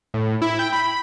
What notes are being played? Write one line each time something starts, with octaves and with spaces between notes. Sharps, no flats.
A2
E4
G5
B5